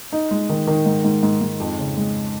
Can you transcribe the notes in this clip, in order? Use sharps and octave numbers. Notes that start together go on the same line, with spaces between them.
D#4
G#3
D#3
D#3
G#2
G#2
G#2
G#2
F2
C#3
G#3